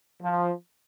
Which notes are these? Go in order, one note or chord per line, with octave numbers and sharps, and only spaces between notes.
F3